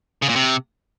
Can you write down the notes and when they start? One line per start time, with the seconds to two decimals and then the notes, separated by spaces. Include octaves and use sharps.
0.22 C#3
0.29 A#2
0.36 C3